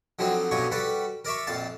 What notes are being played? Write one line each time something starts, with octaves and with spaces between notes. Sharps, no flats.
D3 F3 F#3 C4 D#4
G2 B2 D3 D#4 C#5 C#6
G3 F#4 A4 B4
A#4 D5 E5 C#6
A#1 F2 F5 A5